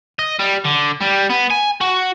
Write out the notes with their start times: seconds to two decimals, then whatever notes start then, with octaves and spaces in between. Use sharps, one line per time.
0.19 D#5
0.39 G3
0.65 D3
1.01 G3
1.30 B3
1.50 G#5
1.81 F#4